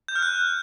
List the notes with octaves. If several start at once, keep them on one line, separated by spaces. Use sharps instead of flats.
G6
F6
F#6